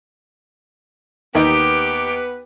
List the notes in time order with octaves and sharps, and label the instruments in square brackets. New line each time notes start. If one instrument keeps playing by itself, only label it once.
[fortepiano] D#2 D#4 [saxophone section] B3 B4 [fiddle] G4 D6